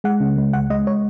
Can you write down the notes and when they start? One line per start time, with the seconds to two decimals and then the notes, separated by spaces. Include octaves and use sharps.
0.04 G#3 F#5
0.20 C#3
0.37 G#3
0.53 C#2 F#5
0.70 G#3 D#5
0.87 C#5